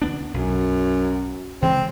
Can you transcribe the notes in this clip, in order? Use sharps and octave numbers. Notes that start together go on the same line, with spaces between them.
D2 B3 D4
B1 F#2
C#3 E3 G#3 C4